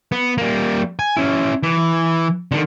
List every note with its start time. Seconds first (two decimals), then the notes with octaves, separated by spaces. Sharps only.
0.12 B3
0.38 G3 A#3
0.99 G#5
1.17 C#4 E4
1.63 E3
2.52 D3 D#3